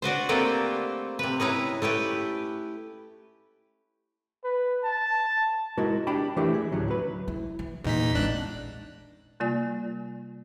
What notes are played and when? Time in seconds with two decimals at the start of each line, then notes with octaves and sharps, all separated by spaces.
0.02 D4 F#4 B4 C5
0.29 A3 A#3 C4 G4 A4 B4
1.19 C3 B4
1.40 C#4 D#4 E4 B4
1.82 A3 E4 G4 B4
4.44 B4
4.83 A5
5.78 G#3 E4 F#4 A#4
6.07 D4 G4 D5 G5 A5 B5
6.36 E3 A3 D4 E4 G4 A#4
6.54 G#4
6.72 D2 A2 F#3 C#4
6.88 F#3 B4
7.28 E4
7.59 E3
7.84 E2 A#2 A#3 D#4 B6
8.14 A1 G#3 C4 D4 F#6
9.40 C3 G3 A#3 F4 D5 G#5